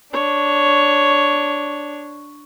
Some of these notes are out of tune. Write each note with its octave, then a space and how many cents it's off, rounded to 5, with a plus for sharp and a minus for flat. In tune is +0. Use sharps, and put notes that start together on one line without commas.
D4 +0 C#5 +5